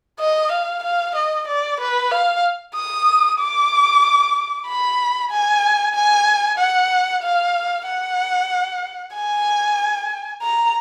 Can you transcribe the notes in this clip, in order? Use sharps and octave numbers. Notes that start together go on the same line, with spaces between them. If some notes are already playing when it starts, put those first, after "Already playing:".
D#5
F5
F5
D#5
D5
B4
F5
D#6
D6
B5
G#5
G#5
F#5
F5
F#5
G#5
A#5